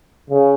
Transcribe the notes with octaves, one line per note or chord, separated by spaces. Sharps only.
C#3